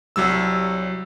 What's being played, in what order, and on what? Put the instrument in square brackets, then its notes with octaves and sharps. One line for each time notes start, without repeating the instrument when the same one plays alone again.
[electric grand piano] C2 F#3 G3 E6